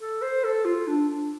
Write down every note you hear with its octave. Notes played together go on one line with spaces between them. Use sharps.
A4
C5
A4
F4
D4
D4